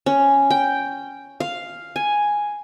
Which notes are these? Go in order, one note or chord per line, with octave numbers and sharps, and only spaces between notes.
C#4
G5
F5
G#5